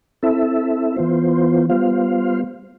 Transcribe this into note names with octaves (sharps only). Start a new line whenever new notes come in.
C4 E4 A4 E5
E3 B3 F4 C5
G3 B3 F4 C5 F5